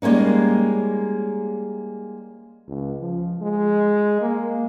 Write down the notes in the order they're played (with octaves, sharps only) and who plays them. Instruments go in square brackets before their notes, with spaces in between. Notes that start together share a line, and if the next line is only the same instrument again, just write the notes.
[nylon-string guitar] G3 G#3 A#3 C#4 D#4
[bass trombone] C#2
F3
G#3
A#3